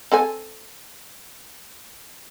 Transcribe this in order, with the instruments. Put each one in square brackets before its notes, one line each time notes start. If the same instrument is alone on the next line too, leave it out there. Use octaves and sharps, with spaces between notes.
[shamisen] C4 A4 G#5